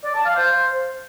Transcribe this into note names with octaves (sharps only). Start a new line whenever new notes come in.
D5
A5
F5
C5